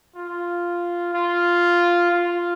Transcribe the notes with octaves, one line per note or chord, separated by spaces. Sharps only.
F4
F4
F4